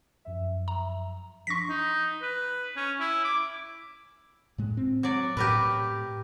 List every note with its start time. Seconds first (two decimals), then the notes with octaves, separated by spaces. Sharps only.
0.25 F#2 F3 E5
0.68 A#5
1.47 F3 D4 C6 C#6 A#6 B6
1.69 D#4
2.22 B4
2.76 C#4
3.00 E4
3.24 D6
4.58 A2 G#3
4.77 C4
5.03 F#3 D5
5.37 A2 G4 A#4 B4